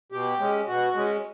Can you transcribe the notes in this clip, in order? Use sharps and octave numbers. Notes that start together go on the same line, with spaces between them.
B2 G4
G#3 C#4
B2 F#4
G#3 C#4